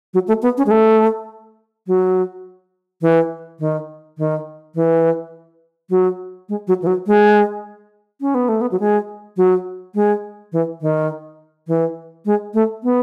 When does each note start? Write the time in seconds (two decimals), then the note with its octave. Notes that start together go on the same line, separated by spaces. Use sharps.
0.14 F#3
0.28 A3
0.42 B3
0.57 C#4
0.66 G#3
0.71 A3
1.87 F#3
3.02 E3
3.59 D#3
4.18 D#3
4.75 E3
5.90 F#3
6.49 G#3
6.67 F#3
6.82 E3
6.87 F#3
7.07 G#3
8.21 C#4
8.35 B3
8.49 A3
8.61 B3
8.72 F#3
8.80 G#3
9.37 F#3
9.95 G#3
10.52 E3
10.81 D#3
11.68 E3
12.26 G#3
12.54 A3
12.83 B3